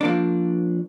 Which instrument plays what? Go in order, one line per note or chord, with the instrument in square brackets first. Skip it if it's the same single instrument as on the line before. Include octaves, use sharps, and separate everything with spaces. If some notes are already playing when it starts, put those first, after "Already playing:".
[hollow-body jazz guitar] F3 A#3 D4